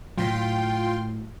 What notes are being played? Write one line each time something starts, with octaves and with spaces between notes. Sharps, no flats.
A2 F#3 F4 G5 C6